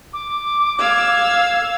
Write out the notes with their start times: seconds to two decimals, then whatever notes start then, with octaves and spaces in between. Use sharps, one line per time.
0.13 D6
0.78 F5 E6 G#6